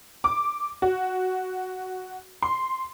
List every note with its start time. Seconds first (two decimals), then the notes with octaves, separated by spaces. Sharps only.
0.24 D6
0.82 F#4
2.42 C6